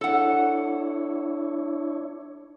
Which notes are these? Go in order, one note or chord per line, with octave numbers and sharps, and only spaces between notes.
D4 E4 A4 C#5 F#5